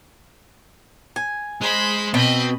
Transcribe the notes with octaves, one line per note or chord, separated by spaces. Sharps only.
G#5
G#3 C5 B5
B2 C4 D#5 B5